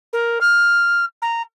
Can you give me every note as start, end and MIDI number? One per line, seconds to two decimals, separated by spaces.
0.13 0.39 70
0.41 1.05 89
1.22 1.42 82